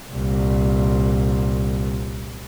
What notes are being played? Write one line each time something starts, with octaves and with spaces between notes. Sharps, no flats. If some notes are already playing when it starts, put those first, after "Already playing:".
C2 A#2